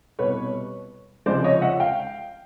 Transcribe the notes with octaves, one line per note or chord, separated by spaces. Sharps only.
C2 B2 G3 B4 C#5
C#2 C3 F3 G#3 C5 D5
C#5 D#5
E5 F#5
F5 G5